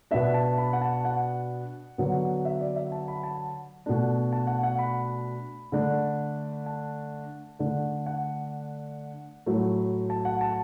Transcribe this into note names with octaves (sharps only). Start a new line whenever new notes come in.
B2 B3 D4 E5
A5
B5
F#5
A5
F#5
D3 F#3 B3
E5
D5
E5
A5
B5
A5
B2 A3 D4
A5
F#5
F#5
B5
D3 A3 D4
A5
D3 A3 D4
F#5
A2 F#3 A3
A5
F#5
A5